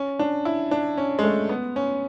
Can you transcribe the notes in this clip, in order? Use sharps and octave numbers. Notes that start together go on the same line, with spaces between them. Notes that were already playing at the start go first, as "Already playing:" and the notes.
Already playing: C#4
D4
E4
D4
C#4
G#3
A3
B3
C#4